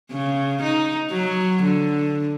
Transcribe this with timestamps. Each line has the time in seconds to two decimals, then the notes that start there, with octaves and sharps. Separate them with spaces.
0.11 C#3
0.63 D#4
1.11 F#3
1.63 D3